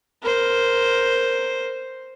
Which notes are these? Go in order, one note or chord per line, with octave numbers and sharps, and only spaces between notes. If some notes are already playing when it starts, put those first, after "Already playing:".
A#4 C5